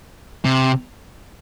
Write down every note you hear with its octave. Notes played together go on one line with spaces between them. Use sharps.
C3